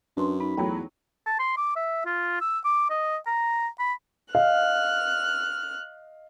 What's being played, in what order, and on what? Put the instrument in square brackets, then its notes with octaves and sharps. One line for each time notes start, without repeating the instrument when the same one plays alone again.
[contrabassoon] F#2 [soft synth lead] D4 [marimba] B4 C6
[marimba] D#4 [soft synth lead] B5
[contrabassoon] E2 [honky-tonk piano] F#3 A3 [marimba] G5 A#5
[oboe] A5
C6
D6
E5
F4
E6
D6
D#5
A#5
B5
[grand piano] D#5 F5 [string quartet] F6 F#6